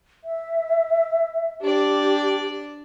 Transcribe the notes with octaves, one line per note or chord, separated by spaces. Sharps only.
E5
D4 G4 D5